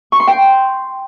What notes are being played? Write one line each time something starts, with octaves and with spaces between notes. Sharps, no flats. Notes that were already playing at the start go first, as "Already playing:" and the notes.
C#6
C6
G5